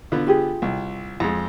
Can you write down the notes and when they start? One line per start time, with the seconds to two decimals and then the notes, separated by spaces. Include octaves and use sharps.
0.12 D3 B3 F4
0.27 F4 G4 G#4
0.62 C2
1.20 F2 G#3